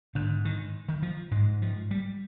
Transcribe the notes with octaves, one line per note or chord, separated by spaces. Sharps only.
G#2 D3
D#3
D#3
F3
G#2 G#3
F3
G3